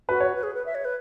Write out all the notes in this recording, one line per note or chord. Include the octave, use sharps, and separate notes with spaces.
F#4 B4
C#5
B4
G#4
B4
E5
C#5
B4